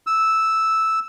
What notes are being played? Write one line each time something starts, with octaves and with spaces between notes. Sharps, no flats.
E6